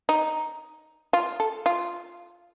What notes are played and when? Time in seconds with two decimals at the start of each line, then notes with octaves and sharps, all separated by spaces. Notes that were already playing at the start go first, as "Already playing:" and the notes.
0.09 D#4
1.13 F4
1.40 A4
1.66 F4